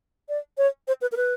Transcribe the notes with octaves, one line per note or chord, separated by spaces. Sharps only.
D5
C#5
C5
B4
A#4
B4